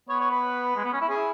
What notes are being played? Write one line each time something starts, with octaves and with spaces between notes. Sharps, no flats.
B3 C#5
C#5
B4
G#3
B3
C#4
E4
C#4 G#4
E4